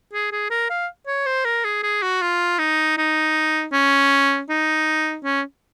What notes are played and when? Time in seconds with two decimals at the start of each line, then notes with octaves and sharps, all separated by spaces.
0.13 G#4
0.32 G#4
0.50 A#4
0.70 F5
1.07 C#5
1.26 C5
1.45 A#4
1.65 G#4
1.83 G#4
2.02 F#4
2.22 F4
2.59 D#4
2.98 D#4
3.73 C#4
4.49 D#4
5.24 C#4